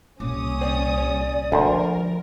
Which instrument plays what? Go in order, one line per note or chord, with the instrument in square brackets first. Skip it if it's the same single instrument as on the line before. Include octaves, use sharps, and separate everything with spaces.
[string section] C2 C#4 D#6 [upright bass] A#2 A#3 [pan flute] D6
[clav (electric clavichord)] C4 [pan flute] D5
[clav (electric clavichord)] D2 C5 [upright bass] F3 [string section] A#4